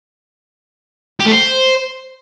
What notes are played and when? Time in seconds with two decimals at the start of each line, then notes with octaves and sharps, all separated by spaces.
1.20 G4
1.26 A3
1.32 C5